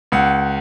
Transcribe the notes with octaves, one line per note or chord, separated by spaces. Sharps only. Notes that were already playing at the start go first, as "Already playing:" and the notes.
C#2 F#5